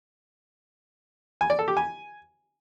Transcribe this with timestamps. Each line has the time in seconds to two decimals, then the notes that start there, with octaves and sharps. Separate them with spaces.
1.41 G#5
1.50 D5
1.59 A4
1.68 G4
1.77 G#5